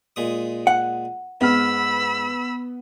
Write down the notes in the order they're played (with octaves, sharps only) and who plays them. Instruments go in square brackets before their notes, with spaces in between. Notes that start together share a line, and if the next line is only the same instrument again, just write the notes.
[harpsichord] A#2 G#3 D#6
[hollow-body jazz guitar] F#5
[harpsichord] G#2 [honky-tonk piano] B3 F6 [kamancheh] B5 E6